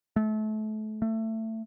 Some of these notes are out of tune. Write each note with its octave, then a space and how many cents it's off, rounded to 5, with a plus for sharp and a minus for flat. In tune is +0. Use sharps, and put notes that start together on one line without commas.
A3 -30
A3 +20